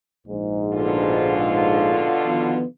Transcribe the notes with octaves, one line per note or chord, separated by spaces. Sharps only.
A#1 G#2
B2 D3 F4
D#3 F3 B3